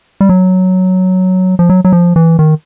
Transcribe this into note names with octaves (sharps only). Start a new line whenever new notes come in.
G3
F#3
F3
F#3
F#3
F3
E3
D#3